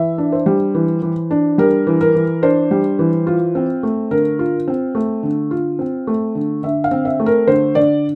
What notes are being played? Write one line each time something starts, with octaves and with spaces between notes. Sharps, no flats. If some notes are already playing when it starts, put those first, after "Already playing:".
Already playing: E3 E5
D4
C5
G3
E3
E3
D4
G3 A#4
E3
A#4
E3
D4 C5
G3
E3
F4
C4
A3
D3 A#4
F4
C4
A3
D3
F4
C4
A3
D3
D3 E5
F5
C4
E5
A3
A#4
D3 C5
D3 D5